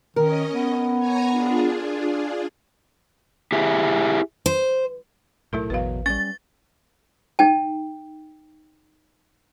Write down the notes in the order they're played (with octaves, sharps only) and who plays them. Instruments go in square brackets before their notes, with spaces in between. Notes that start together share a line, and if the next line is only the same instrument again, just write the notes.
[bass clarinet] D#3 [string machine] C#4 D#5 [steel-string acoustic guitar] A#4
[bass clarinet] B3
[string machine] C#5 G#5 A#5
D4 F4 G#4
[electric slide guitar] E4 G4 G#4 E5
[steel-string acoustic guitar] C5
[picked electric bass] B1 A2 A3 [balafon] F#3 E4 A#4
[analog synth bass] A1 [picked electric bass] E2 B2 F#3 [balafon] B4 F5
[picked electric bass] G3 B3 C#4 [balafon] C#6 [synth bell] A6
[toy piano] D#4 G5 A5